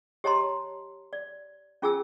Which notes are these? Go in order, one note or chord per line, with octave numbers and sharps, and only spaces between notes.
G4 C#5 D#5 A5 A#5 C6
D5
C#4 F4 G#4 G#5 A5 E6